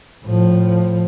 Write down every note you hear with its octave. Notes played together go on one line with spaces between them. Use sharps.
A2 F3